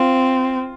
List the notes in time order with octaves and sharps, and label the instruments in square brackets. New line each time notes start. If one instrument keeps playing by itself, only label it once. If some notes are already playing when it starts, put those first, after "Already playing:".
Already playing: [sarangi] C4 [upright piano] F4